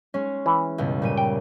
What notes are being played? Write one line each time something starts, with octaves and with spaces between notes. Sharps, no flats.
G#3 C#4
E3
C#2 G2 B2
A#2 G3 D#7
G5